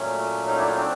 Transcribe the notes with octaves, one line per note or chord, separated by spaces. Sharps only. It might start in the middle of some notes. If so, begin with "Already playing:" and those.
Already playing: A#2 F#3 A3 C#4
C#4 D#4
D4 E4
C#4 D#4
C4 D4